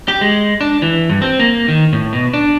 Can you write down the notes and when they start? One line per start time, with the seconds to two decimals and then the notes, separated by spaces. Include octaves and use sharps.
0.08 G4
0.21 G#3
0.61 D4
0.82 E3
1.10 G2
1.22 C4
1.40 A#3
1.68 D#3
1.93 A2
2.13 B2
2.33 D4